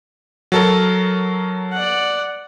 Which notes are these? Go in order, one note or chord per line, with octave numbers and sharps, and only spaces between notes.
F#3 A4 A#4
D5 F#5